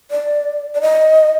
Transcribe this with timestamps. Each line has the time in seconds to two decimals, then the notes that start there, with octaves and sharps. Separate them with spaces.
0.11 D5
0.75 D5
0.81 D#5